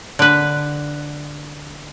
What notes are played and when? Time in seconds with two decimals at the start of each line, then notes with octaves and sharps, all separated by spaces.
0.19 D3 B4